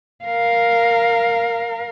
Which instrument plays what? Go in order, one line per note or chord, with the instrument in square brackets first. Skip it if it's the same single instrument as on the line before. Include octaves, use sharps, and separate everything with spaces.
[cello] A#4 F5